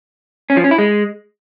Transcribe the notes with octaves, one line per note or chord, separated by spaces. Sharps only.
C#4
F3
C#4
E4
G#3